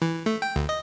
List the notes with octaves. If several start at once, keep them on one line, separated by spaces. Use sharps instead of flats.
E3
A3
G5
D2
D#5